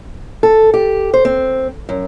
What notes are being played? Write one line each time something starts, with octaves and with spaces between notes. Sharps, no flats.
A4
G4
C5
C4
F#2